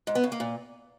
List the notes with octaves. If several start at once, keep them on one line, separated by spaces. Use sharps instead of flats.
G#2
B3
C#3
A#3
A#2